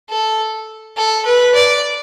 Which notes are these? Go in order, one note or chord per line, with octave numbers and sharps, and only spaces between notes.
A4
A4
B4
D5